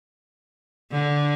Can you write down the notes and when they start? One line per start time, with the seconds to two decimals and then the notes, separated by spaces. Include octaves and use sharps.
0.92 D3